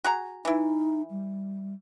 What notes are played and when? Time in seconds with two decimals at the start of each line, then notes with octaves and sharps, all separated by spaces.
0.04 F#4 G#4 A#5
0.45 E3 D#4 E4
1.11 G3